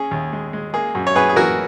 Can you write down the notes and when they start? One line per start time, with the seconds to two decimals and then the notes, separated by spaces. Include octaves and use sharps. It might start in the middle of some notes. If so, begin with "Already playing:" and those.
Already playing: C#4 G#4
0.11 D#2
0.33 G#3
0.53 G#3
0.74 A#3 G#4
0.95 F#2
1.07 C#5
1.15 F#2 G#4 B4
1.29 G#4
1.36 E3 F#4 A#4